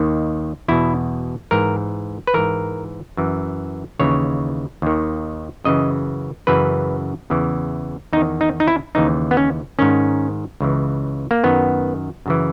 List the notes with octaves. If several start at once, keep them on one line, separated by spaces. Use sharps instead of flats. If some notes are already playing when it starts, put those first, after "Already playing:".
Already playing: D#2 D#3
E2 B2 E4
G#2 E3 A#4
B4
G#2 E3 A#4
F#2 E3
D#2 C#3 E3 C#5
D#2 D#3
F#2 C#3 E3 D#5
F#2 C#3 E3 B4
E2 C#3 E3
E2 D#3 D#4
D#4
D#4
E4
D#2 C#3 E3 D#4
B3
C#4
G#2 D#3 C#4
C#2 C#3 E3
A#3
F#2 D#3 B3
F#2 C#3 E3